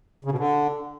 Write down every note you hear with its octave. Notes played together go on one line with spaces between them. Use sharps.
C#3
B2
D3